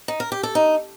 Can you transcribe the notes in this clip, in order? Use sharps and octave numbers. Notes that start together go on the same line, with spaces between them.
D#4
A#4
G4
A4
D#4